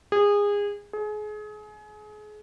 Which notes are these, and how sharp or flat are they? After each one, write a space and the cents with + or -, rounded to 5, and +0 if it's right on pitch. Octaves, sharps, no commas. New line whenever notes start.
G#4 -25
G#4 +30